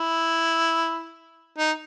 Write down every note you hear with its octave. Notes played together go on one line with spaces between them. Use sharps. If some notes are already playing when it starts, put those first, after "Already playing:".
Already playing: E4
D#4